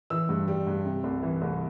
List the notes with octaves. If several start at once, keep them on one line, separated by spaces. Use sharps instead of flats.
E3 E6
G2
G3
G2
C3
C2
E3
C2